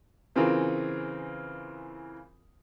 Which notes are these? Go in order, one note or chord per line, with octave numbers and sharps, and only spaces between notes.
C#3 E3 C4 F4 G#4 A#4